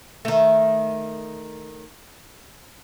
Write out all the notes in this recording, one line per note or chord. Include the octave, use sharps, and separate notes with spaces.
D#3 A3